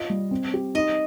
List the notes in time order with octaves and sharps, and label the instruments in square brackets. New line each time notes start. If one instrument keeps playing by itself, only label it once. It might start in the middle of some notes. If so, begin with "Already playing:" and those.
Already playing: [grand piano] F4 [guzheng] D#5
[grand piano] G3
C4
G4
[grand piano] D#4 [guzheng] D#5